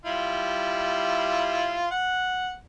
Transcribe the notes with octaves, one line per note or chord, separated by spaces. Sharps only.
G3 E4 F4
F#5